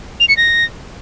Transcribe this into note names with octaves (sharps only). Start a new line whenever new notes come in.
F7
C#7
A#6